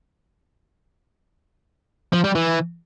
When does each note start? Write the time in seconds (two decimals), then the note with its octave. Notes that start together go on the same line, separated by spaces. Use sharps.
2.13 F3
2.24 G3
2.35 E3